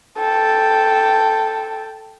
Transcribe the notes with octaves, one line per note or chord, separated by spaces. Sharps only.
A4 G5